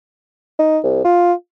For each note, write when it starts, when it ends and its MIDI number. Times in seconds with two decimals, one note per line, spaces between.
0.59 0.78 63
0.83 1.04 36
1.04 1.33 65